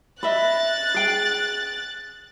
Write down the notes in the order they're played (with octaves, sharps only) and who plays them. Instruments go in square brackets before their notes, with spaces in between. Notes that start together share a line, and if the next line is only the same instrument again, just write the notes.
[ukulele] D#5 E5 B5 [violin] F#6 A6
[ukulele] G#4 G5